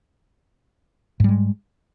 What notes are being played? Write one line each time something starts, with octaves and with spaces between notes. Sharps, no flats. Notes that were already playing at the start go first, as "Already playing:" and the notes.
G#2 G3 G#3